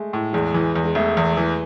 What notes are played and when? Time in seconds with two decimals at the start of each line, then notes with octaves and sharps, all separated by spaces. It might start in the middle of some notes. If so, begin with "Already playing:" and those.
Already playing: G#3 A3
0.13 A2
0.33 E2 G#3
0.54 E3
0.76 E2
0.84 G#3
0.95 E1 A3
1.17 E2
1.37 E3